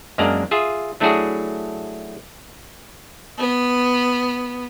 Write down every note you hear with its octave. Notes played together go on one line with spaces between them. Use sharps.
F#2 G#3 A#3 D4 D5 A#5
F4 G#4 E5
F#3 A3 D4 E4 F#4 G#4
B3